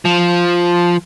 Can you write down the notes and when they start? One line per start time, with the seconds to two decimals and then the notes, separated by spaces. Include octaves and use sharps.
0.05 F3